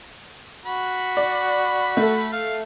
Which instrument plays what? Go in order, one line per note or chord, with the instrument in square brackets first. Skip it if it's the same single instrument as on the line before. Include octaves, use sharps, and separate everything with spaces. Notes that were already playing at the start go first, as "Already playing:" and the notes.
[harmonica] F#4 B5
[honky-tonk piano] D5
A3 A4
[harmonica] F5